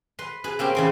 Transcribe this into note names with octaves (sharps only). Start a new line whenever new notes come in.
B4 C6
G#4 B4
A#3 C4 C#4 G4
C#3 E3 C6